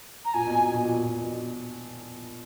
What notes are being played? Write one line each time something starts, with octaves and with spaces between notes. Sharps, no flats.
A#5
A#2 G#5
B2
B2
B2
A#2
A#2
B2